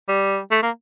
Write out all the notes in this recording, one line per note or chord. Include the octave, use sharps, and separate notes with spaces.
G3
A3
A#3